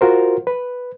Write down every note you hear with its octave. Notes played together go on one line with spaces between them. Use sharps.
F4 F#4 A#4 C5
B4